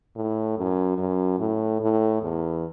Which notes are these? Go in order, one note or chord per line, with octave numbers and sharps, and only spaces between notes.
A2
F#2
F#2
A2
A2
E2